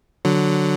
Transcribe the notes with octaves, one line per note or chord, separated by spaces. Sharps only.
D3 F#3